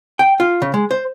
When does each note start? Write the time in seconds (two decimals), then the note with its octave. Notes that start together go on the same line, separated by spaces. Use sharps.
0.19 G5
0.40 F4
0.62 C#3
0.74 G#3
0.91 C5